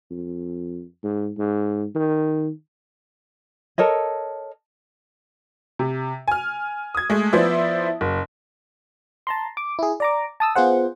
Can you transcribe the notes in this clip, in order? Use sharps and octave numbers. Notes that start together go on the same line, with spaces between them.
F2
G#2
G#2
D#3
A4 A#4 C#5 D#5
C3
G#5 F6
D#6 G#6
G#3 A3
F3 B3 E4 C5 D5 E5
F#1
A5 A#5 C6
D6
E4 G#4
D5 A#5 D6
A5 D#6 E6
B3 F4 G#4 C5 F#5